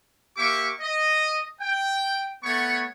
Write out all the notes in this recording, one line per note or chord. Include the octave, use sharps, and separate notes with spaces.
A#3 G4 E5 C#6 D6
D#5
G5
A3 B3 C#5 F#5 C#6